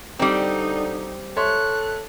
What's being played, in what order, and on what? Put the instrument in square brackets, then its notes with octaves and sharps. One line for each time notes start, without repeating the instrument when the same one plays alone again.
[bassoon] D3 [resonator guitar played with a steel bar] G3 C4 [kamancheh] D#4
[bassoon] A4 [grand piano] C#5 E5 C6 [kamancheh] F#6